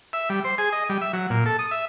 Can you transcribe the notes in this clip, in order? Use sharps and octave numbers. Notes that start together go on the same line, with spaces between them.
E5
G3
C5
G#4
D#5
G3
E5
F#3
A#2
A4
D#6
E5